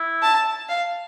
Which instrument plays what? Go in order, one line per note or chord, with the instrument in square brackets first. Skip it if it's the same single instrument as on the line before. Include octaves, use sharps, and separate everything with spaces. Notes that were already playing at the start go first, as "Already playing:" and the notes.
Already playing: [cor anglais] E4
[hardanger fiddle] A5
F5